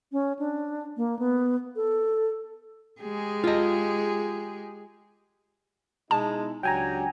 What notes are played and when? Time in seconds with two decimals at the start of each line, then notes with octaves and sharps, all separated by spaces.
0.12 C#4
0.39 D4
0.97 A#3
1.19 B3
1.76 A4
3.02 G#3 G4 G#4
3.44 F4 D#5
6.11 B2 G#3 D#4 E4 A5
6.63 C#2 F#3 D4 G4 G5 G#5 A#5